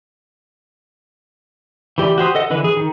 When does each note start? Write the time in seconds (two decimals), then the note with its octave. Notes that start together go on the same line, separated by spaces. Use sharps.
1.98 E3 G4 D5
2.18 F#4 G4 C5 D#6
2.35 A4 D#5 F#5
2.50 D3 E3 B4
2.64 G#4
2.77 D#3